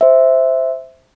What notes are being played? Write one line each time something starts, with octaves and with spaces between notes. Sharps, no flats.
C5 E5